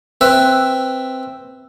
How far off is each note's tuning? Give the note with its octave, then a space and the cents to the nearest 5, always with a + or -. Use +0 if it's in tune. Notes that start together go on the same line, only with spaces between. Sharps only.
C4 +0 B4 +0 E5 +0